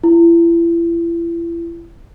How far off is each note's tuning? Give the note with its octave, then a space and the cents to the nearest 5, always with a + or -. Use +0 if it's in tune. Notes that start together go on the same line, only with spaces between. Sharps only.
E4 +35